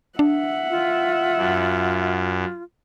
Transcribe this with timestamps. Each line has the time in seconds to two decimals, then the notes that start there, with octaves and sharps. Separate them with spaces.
0.19 D4 E5 F#5
0.70 F4
1.37 F#2